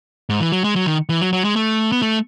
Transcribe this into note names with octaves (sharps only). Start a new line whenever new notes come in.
G#2
E3
F#3
G#3
F#3
D#3
E3
F#3
F#3
G#3
A3
B3
A3